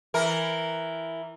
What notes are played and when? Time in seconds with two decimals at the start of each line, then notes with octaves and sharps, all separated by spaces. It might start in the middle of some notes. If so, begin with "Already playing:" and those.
0.14 E3 A#4